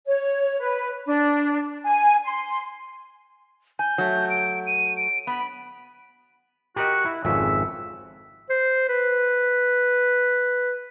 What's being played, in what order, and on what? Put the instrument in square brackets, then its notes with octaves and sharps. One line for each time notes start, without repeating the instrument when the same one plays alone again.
[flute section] C#5
B4
D4
G#5
C6
[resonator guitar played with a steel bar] G#5 [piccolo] G6
[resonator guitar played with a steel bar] F#3 A3
[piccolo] D7
D#7
D7
[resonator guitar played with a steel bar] B3 [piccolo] B5
[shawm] F#4 [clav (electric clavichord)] G4 A#4 D#5
[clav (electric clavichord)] E4
[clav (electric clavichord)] G#1 F2 C#3 [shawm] E5
[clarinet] C5
B4